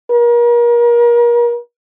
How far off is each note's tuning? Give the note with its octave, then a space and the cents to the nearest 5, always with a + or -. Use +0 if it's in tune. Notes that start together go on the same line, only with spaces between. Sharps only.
A#4 +35